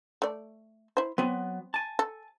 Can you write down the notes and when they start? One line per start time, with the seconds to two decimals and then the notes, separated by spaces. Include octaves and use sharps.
0.22 A3 D5
0.97 E4 C5
1.18 F#3 B3 C4
1.74 G#5 A5
1.99 A4